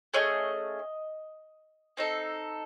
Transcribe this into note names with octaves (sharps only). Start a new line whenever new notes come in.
A3 C#4 G#4 D#5
C4 D#4 A4